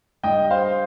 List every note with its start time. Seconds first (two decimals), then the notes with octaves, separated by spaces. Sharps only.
0.23 G2 G3 D#5 G5
0.50 C5 F5